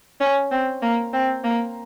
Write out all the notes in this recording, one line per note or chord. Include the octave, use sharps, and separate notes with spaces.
C#4
C4
A#3
C4
A#3